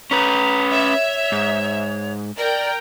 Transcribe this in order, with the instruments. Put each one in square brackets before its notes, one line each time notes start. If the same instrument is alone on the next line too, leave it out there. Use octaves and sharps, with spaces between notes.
[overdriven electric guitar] C#4 B4 [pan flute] A#5
[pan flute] C#5 [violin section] E5
[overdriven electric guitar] G#2
[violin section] A#4 G5 [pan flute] D5